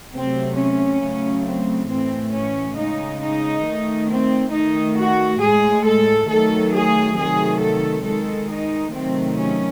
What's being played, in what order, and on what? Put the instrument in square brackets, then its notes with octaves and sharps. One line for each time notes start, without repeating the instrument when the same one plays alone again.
[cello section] C3 F#3 A3 C4
C#4
C#3 F#3 A3
C4
A2 E3 A3 C4
C#4
C#3 G#3 D#4
D#4
D#3 A3
C4
D#3 A3 D#4
F#4
A2 G#3 G#4
A4
D#3 F#3 A3 A4
G#4
C3 D#3 F#3 A3 G#4
A4
D#3 G#3 A4
D#4
C3 D#3 F#3 A3 C4
C#4